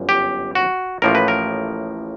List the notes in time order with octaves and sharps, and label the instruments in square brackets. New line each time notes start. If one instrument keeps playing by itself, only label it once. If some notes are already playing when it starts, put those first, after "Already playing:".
Already playing: [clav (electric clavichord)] G1 F#2
G4
F#4
A1 A2 F3 A#3 A#4
B4
A#4